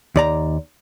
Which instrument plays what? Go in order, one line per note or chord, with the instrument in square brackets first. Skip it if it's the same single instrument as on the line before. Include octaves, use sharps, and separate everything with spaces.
[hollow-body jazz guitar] D#2 D5 A#5